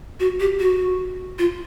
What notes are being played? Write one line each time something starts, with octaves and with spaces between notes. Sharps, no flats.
F#4
G4
F#4
F4